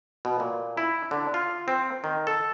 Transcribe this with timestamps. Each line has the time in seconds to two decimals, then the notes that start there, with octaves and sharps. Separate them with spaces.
0.25 B2
0.40 A#2
0.77 E4
1.11 D3
1.34 F4
1.68 C4
2.04 D#3
2.27 A4